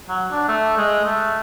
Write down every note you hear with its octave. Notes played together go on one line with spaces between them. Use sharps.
F#3
D4
A3
G#3
A3